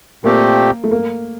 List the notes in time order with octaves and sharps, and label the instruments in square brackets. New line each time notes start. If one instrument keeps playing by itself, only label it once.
[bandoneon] A#2 A3 C4 G4 [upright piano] A#3
[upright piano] A3
A#3